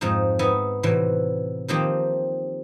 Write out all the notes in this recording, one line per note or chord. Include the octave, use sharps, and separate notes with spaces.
F2 G#2 F3 D#4
B3 D#4 D#5 E5 G#5
A2 C3 E3 F#3
D#3 F3 A#3 C4 G4